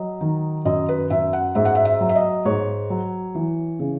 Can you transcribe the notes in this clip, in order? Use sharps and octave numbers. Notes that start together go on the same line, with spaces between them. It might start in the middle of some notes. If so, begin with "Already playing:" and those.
Already playing: F#3 D#5
D#3
F#2 D#5
B4
F#2 E5
F#5
G#2 E5
F#5
E5
E5
F#3
E5
D#5
G#2 C#5
F#3
E3
C#3